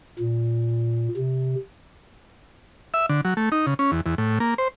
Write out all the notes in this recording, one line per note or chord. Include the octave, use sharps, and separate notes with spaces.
A#2
C3
E5
D3
F#3
A3
D#4
C#3
C#4
E2
E2
A2
A#3
C5